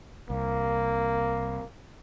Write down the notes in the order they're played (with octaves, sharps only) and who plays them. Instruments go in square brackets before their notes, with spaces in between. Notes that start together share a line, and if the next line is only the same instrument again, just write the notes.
[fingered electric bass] C2 [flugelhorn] A#3